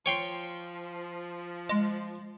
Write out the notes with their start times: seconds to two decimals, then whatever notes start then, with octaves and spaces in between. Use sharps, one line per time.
0.06 F3 C#5 G5 C6
1.69 G#3